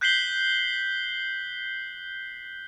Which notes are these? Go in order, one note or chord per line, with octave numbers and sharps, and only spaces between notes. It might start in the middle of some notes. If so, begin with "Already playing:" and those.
F#6 G6 B6 C7 F#7 G7